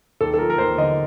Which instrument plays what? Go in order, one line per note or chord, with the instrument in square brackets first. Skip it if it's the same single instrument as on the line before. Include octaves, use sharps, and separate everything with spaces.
[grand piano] D#2 A4
A4
F3 A#4
A#4
D#2 C5
D3 D#5